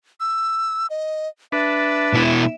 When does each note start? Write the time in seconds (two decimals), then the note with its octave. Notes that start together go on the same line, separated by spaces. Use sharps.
0.20 E6
0.90 D#5
1.52 D4 B4 E5 A5
2.13 B2 E4